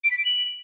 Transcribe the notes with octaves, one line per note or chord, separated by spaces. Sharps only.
D7
B6
D7
F#7